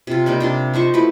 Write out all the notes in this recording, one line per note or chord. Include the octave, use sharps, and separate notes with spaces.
C3 F4
G3 A#3 D#4 G4
C3 D4 C6
F3 D#4 C5 C#6
A3 E4 F#4 B4